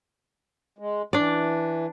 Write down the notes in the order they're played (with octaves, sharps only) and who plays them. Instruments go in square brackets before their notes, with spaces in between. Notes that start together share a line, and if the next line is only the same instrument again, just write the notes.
[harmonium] G#3
[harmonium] E3 [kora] D4 D5